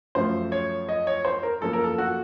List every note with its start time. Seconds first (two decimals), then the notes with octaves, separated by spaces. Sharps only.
0.15 F#2 F3 A3 C5
0.52 C#5
0.89 D#5
1.07 C#5
1.25 C5
1.43 A#4
1.61 F#2 F3 A#3 A4
1.73 A#4
1.84 A4
1.98 F#4